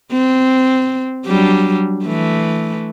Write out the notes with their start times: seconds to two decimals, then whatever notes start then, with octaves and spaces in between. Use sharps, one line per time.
0.12 C4
1.26 F#3 G3 D4
2.05 E3 A3